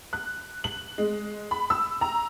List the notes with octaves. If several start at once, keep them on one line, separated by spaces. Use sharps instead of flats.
F#6
F#7
G#3
B5
E6
A#5